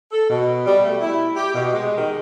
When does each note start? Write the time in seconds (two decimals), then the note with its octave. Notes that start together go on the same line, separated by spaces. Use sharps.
0.12 A4
0.30 B2
0.66 G3
0.85 A3
1.01 E4
1.36 G4
1.54 B2
1.73 G#3
1.97 D#3